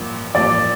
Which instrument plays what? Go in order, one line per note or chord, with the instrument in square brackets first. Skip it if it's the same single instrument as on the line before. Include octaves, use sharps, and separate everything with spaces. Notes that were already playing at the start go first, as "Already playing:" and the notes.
Already playing: [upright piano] A1 G2 F3 A#3
[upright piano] A1 G2 F3 A#3 [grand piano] D5